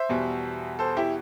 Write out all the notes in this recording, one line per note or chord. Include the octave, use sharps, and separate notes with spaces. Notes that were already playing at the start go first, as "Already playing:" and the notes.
Already playing: C5 E5
E2 B2 G3
A4 C5
E4 G4